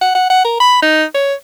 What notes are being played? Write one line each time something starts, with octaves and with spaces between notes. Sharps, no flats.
F#5
F#5
F#5
A#4
B5
D#4
C#5